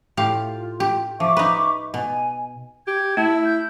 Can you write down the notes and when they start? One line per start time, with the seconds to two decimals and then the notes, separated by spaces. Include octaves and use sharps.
0.17 A2 F4 G4 F5
0.80 G4
1.20 F3 E5 C#6 D6
1.37 D#4 B4
1.94 B2 G#5
2.87 G4 G#6
3.17 A3 E4 A5
3.45 G6